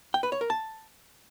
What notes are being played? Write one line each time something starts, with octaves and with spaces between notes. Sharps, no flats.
G5
B4
C#5
A#4
A5